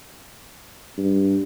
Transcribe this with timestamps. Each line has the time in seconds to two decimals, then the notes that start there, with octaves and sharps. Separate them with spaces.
0.98 G2